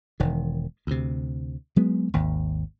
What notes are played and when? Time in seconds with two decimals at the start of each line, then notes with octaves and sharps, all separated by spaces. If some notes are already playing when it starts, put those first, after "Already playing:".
0.20 E1 D#3
0.87 D2 C3
1.76 F#3 G#3 B3
2.14 G#1 D#2